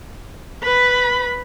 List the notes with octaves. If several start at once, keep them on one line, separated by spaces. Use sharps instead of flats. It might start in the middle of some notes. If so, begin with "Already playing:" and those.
B4 B5